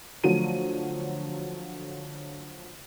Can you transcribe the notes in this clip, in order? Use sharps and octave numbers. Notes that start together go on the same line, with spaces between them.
D3 F3 F#3 A3 D#7